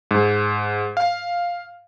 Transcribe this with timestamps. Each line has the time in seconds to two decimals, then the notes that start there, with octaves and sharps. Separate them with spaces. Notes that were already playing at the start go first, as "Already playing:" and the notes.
0.11 G#2
0.97 F5